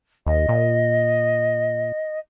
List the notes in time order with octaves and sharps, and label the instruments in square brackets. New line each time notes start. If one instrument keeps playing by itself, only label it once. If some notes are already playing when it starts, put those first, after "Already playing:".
[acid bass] D#2 [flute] D#5
[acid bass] A#2